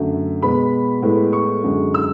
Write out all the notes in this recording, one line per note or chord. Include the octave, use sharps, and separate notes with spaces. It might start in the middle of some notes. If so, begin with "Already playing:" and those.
Already playing: F#2 D3 A3
B2 G#3 B3 B5
A2 G#3 B3
C#6
F#2 D3 G#3
E6